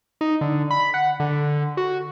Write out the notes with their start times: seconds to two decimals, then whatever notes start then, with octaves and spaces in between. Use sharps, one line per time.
0.21 D#4
0.41 D3
0.71 B5
0.94 F#5
1.20 D3
1.77 F#4